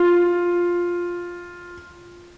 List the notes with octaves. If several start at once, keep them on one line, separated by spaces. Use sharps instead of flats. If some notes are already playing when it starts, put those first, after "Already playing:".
Already playing: F4